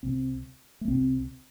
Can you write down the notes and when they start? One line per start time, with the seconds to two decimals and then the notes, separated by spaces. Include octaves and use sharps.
0.03 C2 C3 C4
0.81 A3
0.88 C2 C3 C4